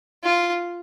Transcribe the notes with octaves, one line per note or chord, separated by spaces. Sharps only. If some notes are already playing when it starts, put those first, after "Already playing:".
F4